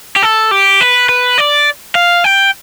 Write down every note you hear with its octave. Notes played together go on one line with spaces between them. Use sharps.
G4
A4
G4
B4
B4
D5
F5
G5